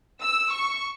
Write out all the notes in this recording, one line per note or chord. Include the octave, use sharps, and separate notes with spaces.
E6
C#6